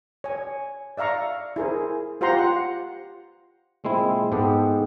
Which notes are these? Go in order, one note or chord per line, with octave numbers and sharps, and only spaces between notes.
C#5 G#5
D5 E5 F5 A#5 C#6
E4 G#4 A#4 C5
F4 G4 C5 F#5 A#5 C6
F#5
A#2 G#3 C4 E4
G#2 G#3 B3 G4 A4